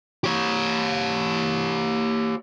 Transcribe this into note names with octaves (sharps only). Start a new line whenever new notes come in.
G4 C#5